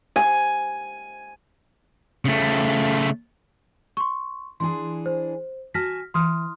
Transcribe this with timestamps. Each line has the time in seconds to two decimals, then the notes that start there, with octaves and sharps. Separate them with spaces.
0.16 G#5
2.25 C#3 A3
3.97 C6 C#6
4.60 E3 D4 G#4 C6
5.06 C5
5.74 F#4 G#5 A5 F6 A#6 B6
6.14 E3 C6 D#6 F6